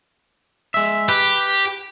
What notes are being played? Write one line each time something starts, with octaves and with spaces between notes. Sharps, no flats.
G#3 E5
G4 B4